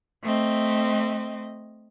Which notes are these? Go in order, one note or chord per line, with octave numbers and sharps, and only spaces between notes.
A3 C4 D#5